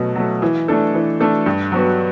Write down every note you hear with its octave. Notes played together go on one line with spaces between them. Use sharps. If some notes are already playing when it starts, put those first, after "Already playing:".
Already playing: B2 F#3 A3
F#3 A3
E3
A3 D4 A4
E3
A3 D4 A4
G2
F#3 B3 F#4